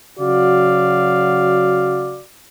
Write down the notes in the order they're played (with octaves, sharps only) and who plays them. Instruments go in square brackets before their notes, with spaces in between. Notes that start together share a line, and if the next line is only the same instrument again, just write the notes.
[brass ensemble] C#3 F#3 F#4 D5 F5